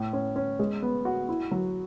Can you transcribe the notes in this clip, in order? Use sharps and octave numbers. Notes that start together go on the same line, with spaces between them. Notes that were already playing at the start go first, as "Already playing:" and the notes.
Already playing: A2
C#4
C#4
G#3
B3
F#4
E4
F#3